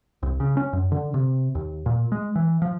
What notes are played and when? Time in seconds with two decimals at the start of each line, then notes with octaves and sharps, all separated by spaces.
0.23 C2
0.40 C#3
0.57 C#4
0.73 F#2
0.92 D3
1.14 C3
1.55 D#2
1.86 A#2
2.12 G#3
2.36 E3
2.62 F3